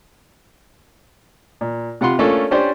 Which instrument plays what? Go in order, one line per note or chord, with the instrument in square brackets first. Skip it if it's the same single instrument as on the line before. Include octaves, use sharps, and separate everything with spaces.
[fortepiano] A#2
C3 F4 F#5 B5 C6
A3 A#3 C#4 D4 F4 A4
C#4 D4 G4 C5 D5